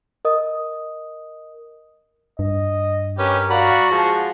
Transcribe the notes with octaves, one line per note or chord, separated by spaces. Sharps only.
A#4 D#5 D#6
G2 D#5
C#4 G4 A#4 B4
F#4 D5 F5 A#5 B5
F3 G#3 A5